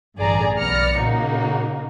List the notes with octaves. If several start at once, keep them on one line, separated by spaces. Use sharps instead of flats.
A1 G2 D3 G#4 D5 A#5
B1 B3 D5 F6 A#6 C#7
A#2 C#3 A#3 D#4 F#4